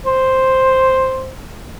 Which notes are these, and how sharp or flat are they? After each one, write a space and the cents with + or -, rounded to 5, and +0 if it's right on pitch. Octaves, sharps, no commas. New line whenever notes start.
C5 +0